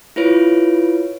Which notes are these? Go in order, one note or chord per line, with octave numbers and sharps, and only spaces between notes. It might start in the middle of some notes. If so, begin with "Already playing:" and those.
E4 F4 B4 C#5 D7